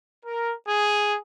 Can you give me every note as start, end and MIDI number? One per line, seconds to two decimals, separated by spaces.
0.24 0.52 70
0.68 1.17 68